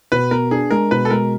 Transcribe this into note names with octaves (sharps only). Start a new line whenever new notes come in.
B2 B4
B3 A#4
D4 G#4
G#3 A#4
B2 B4
A4
G#3 A#4